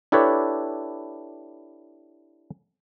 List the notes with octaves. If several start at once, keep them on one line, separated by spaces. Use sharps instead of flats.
D4 E4 G4 A4 B4 C#5